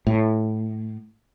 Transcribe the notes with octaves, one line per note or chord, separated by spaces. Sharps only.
A2